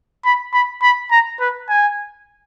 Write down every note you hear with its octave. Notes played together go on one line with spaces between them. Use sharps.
B5
B5
B5
A#5
B4
G#5